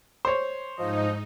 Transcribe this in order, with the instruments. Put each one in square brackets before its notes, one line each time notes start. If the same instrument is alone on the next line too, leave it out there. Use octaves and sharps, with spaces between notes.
[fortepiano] C5 C#5
[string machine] G#2 D#4 [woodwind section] F3 D#5